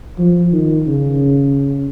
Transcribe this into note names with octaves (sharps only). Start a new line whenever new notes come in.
F3
D#3
C#3